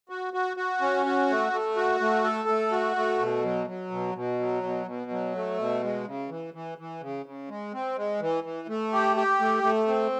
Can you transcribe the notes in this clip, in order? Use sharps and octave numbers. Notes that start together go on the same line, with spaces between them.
F#4
F#4
F#4
C#4
F#4
A3
A3
F#4
A3
A4
A3
F#4
A3
B2
F#3
F#3
B2
B2
F#3
B2
B2
F#3
A3
B2
G#3
C#3
E3
E3
E3
C#3
C#3
G#3
C4
G#3
E3
E3
A3
G4
G4
A3
A3
C4